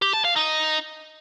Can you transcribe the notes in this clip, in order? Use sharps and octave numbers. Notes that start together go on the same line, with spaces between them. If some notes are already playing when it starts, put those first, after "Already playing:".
G4
A5
F5
D#4